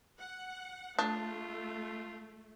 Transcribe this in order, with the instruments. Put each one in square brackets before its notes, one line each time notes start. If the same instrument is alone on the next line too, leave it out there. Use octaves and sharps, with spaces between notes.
[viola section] F#5
[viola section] A3 [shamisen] D4 [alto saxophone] F4